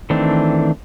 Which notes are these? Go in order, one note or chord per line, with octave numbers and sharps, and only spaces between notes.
D#3 E3 A3 C4 D4